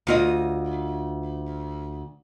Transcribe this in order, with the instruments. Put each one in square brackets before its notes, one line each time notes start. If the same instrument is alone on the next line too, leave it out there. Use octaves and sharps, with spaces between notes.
[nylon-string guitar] D2 F4 D#5